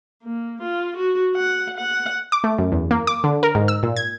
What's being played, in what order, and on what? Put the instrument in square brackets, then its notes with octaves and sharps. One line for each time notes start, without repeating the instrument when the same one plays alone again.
[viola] A#3
F4
F#4
F#5
F#5
[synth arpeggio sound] D6
A3
F#2
E2
A#3
D6
D3
A#4
G#2
E6
A#2
G#6